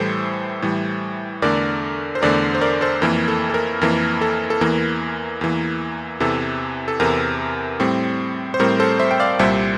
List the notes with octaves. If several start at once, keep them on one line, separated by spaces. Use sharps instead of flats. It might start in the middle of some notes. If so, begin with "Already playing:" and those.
Already playing: A2 E3 G3 A4 C5
A2 E3 G3
E2 D3 A3 A#4 D5
C5
E2 D3 A3 A#4 D5
C5
A#4 D5
A4 C5
F2 E3 A#3 A#4
A4
A4
A#4
F2 E3 A#3 A#4
A4
A4
E2 E3 A#3 A#4
E2 E3 A#3
E2 C3 E3 A4
A4
E2 C3 E3 A#4
A2 G3 C4
C5
A2 G3 C4 A#4
A4 C5
C5 E5
G5
D5 F5
C2 A#2 G3 C5 E5